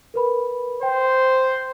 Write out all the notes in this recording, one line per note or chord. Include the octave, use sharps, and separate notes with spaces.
A#4 B4 B5
C5 G5